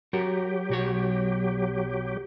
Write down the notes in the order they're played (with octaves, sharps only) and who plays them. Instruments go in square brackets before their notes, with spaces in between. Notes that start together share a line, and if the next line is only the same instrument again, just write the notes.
[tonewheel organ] F#3 G4 [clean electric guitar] F#4 A#4
[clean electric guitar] B1 F#4 C#5